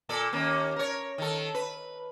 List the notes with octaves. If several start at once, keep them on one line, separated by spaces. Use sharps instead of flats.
A#2 A4 D5
D#2 A#3 C#4
A#4 C#5
D#3 A4
B4